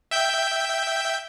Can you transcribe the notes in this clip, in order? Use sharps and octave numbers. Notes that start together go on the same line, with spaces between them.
E5 G5 G6